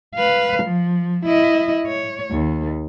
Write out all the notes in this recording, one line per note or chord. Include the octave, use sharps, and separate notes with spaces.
B4 F5
F3
E4 D#5
C#5
D#2